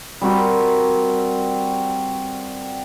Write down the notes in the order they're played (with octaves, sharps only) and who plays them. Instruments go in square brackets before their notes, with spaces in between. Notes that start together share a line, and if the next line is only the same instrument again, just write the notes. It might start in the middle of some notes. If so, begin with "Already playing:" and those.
[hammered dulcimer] G3 C4 F#4 A#4